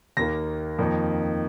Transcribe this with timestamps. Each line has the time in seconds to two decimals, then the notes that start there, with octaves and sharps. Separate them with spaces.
0.17 D#2 D#3 A#3 A#6
0.79 F2 D#3 A#3 D#4